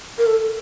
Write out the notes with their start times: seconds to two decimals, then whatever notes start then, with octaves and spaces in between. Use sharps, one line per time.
0.18 A#4
0.27 A4